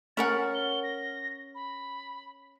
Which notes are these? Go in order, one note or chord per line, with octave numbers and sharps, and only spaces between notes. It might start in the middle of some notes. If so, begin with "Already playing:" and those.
C#4 A#4 F#5 A6
G7
A#6
B5